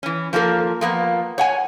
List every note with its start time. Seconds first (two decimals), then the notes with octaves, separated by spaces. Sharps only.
0.03 E3 C#4
0.33 F3 A#3 C#4 F#4 A4 A#4
0.81 F3 A#3 B3
1.38 C#5 F#5 G#5